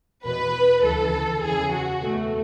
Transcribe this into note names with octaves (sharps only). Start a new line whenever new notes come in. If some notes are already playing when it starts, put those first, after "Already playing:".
E2 B2 B4
D2 C#3 E3 A4
E2 C#3 E3 G#4
F#4
E2 B2 A3